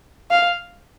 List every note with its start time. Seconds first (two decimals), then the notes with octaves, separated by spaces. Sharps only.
0.31 F5